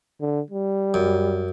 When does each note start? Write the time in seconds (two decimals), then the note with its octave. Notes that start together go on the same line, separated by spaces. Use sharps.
0.21 D3
0.50 G3
0.94 F#2